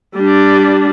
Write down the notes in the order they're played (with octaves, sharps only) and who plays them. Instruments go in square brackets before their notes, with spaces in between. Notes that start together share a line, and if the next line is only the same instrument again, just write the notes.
[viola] G3 D4